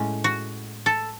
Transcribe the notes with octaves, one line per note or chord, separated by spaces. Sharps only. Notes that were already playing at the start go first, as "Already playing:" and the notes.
Already playing: A2 G#3 C#4
F#4
A4